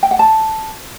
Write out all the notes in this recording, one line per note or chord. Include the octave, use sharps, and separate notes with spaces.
G5
F#5
A5